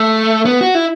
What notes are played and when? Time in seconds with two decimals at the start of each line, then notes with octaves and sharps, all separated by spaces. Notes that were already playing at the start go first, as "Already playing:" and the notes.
Already playing: A3
0.45 B3
0.61 F#4
0.75 E4